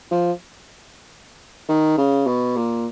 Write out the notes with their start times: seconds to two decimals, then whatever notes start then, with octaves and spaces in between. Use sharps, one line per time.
0.11 F3
1.69 D#3
1.98 C#3
2.27 B2
2.56 A#2